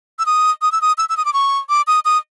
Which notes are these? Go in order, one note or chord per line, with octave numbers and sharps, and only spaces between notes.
E6
D#6
D#6
E6
D#6
E6
E6
D#6
D6
C#6
D6
D#6
D#6